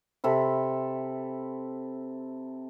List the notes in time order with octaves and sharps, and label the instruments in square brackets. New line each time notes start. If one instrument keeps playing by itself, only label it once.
[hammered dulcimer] C3 A4 B5